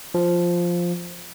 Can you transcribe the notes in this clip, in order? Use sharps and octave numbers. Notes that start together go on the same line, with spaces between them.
F3